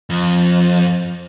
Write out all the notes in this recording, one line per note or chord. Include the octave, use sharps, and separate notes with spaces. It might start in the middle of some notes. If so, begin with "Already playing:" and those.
F2